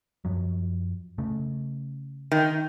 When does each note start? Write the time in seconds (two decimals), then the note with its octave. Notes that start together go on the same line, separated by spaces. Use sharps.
0.25 F#2 F3 F#3
1.18 C#3 A3
2.32 D#3